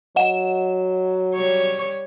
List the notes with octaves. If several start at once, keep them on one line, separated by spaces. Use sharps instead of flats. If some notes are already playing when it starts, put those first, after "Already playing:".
F#3 D#5 F#5 E7
G3 C#5